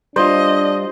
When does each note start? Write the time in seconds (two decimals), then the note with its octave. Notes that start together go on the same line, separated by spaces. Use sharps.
0.16 G3 D4 F4 C5 D#5